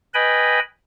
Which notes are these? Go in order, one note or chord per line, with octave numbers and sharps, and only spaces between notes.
B4 D#5 G5 G#5 B5